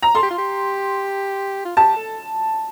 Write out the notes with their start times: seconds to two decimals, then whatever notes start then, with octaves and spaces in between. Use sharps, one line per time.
0.02 A#5
0.15 A4 C6
0.23 G4
0.31 F4
0.38 G4
1.65 F4
1.77 G4 A5
1.96 A4